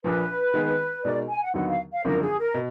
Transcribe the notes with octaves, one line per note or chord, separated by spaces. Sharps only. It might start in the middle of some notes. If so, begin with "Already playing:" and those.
A#1 A#2 F3 B4
D#3 G#3 B3 D#4 G#4
B2 G#3 D#4 A#4 D5
G#5
F#5
D#2 D3 F#3 B3 D#4 F#5
F5
F5
G#1 F#2 D3 F3 A#4
G#4
A#4
B2